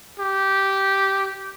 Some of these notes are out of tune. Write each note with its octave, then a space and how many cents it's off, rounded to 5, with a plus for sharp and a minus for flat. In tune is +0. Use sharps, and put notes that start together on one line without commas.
G4 -10